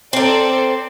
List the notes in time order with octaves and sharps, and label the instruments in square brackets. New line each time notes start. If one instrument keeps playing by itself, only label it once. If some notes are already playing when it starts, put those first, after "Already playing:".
[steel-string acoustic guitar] C4 A#4 [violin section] A4 C5 D5